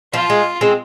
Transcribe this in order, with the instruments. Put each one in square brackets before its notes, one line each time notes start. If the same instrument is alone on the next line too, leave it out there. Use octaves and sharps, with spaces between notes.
[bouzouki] F3 [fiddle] F4
[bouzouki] G#3
G#3 C4